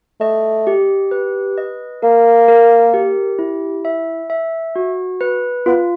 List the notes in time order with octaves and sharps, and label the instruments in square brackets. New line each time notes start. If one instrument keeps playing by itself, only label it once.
[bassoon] A3 [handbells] D#5
[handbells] G4
B4
D#5
[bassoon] A#3 [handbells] A#4
[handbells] A#4
G4
E4
E5
E5
F#4
B4
[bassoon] B3 [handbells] F4